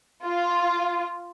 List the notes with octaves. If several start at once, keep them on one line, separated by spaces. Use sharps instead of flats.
F4